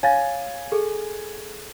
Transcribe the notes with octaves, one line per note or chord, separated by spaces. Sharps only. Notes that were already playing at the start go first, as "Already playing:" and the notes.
C#5 F5 G#5 A6
G#4 A4